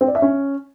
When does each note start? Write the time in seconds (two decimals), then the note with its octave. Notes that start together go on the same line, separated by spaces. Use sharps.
0.01 C4
0.08 D5
0.15 E5
0.22 C#4